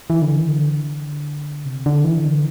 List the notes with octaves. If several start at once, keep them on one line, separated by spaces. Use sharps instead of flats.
E3
D3
E3
D3
C3
D3
E3
D3